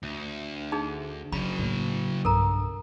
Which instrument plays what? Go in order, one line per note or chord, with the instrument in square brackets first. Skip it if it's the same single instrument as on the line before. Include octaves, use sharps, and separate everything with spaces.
[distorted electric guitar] D2
[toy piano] D4 D#4 G#4
[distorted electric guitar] C#3 F#3 [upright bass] G3 [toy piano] B5
[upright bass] A2 A#3
[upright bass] B1 G2 [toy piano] A4 A#4 A#5